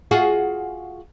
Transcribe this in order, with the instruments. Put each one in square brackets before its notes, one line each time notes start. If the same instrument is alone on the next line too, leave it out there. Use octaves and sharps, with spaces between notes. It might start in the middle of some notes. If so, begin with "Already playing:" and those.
[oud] F4 F#4 G#4